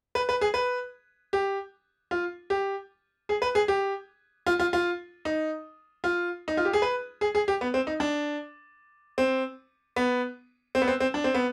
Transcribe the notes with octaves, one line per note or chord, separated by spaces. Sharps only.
B4
B4
G#4
B4
G4
F4
G4
G#4
B4
G#4
G4
F4
F4
F4
D#4
F4
D#4
F4
G4
G#4
B4
G#4
G#4
G4
B3
C4
D#4
D4
C4
B3
C4
B3
C4
C4
D4
C4
B3